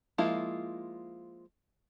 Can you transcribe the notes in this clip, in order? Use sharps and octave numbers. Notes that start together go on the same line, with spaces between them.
F3 G#3 A#3 E4 F4